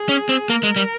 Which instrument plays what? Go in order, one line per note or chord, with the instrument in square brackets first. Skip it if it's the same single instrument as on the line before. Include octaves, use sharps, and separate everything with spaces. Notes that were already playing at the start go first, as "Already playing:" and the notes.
Already playing: [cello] G#4
[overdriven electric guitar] C#4
C4
[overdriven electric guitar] A#3 [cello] A#4
[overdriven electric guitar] G#3
G3